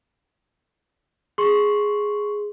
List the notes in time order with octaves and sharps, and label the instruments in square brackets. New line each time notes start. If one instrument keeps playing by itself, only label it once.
[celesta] G#4 [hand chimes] C6 C#6